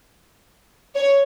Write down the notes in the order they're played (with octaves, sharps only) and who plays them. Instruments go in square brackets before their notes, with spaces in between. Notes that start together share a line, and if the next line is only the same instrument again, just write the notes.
[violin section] C#5